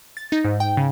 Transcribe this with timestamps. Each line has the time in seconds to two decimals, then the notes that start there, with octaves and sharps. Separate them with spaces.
0.17 A6
0.32 D#4
0.45 G#2
0.60 G5
0.77 C#3